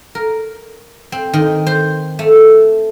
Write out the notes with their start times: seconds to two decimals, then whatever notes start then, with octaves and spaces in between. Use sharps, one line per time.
0.15 A#4
1.12 C4
1.33 D#3
1.67 C5
2.19 A3